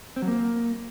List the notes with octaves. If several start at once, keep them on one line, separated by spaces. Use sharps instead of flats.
C4
F#3
A#3